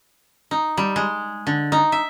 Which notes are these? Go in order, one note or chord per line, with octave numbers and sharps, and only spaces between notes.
D#4
G3
G#3
D3
D#4
E5